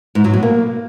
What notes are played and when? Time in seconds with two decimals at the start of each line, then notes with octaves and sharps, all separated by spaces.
0.15 G#2
0.24 F#3
0.33 B2
0.43 A#3